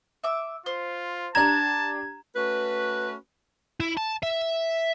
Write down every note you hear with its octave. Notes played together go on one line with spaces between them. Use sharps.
E5 D6
F4 C5
D4 G4 A5 A#5 F#6 G#6 E7
A3 C#4 F#4 B4
E4
A5
E5